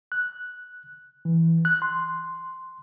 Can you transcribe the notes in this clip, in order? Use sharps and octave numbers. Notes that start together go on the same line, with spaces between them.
F#6
E3
F#6
C6